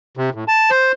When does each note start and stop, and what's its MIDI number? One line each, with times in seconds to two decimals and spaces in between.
0.17 0.30 48
0.35 0.44 45
0.48 0.70 81
0.70 0.92 72